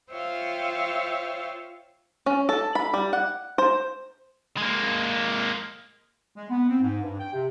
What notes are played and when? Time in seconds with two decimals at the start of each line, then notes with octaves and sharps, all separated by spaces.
0.11 F4 C5 C#5 E5 F5 G5
2.26 C#4
2.49 A4
2.75 B5
2.94 G3
3.13 F#5
3.58 C5
4.58 G#3 A#3
6.37 G#3
6.50 B3
6.69 C4
6.81 G#2
7.02 G2
7.19 G5
7.33 C3